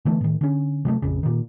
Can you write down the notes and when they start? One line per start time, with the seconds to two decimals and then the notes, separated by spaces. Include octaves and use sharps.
0.05 D3 E3 A3 B3
0.21 A2 D#3
0.41 D3 C#4
0.85 C3 F#3 G3 A3
1.02 A#1 F2 C#3
1.23 A#2 D#3